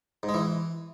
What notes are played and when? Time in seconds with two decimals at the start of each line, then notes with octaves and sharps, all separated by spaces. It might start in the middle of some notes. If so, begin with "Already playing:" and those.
0.23 G#2
0.29 G#3
0.34 E3